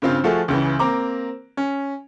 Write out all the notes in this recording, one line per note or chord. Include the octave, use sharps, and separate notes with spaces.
G2 C#3 C4 F4
F3 A3 F4 F#4 G#4 A4
C#2 C#3 E3
A#3 C4 A#5 D6
C#4